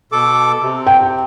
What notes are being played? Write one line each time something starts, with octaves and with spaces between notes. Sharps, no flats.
B2 A4 D6
C3
G5